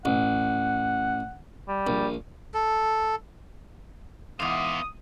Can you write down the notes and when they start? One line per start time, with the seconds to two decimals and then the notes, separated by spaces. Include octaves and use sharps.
0.05 A1 F#5
1.68 G3
1.87 A#1
2.54 A4
4.40 E2 G#2 B3 F5 F#5 C6 D6 D#6